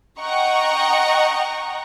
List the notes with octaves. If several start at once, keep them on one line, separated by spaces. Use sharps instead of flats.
D#5 F#5 G5 A#5 C#6